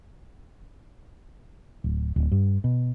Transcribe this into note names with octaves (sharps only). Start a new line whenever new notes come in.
D1
D1
G2
B2